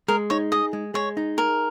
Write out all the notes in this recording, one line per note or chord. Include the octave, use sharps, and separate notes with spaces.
G#3 A#4
D#4 C#5
G#4 D#5
G#3
G#3 C#5
D#4
G#4 A#4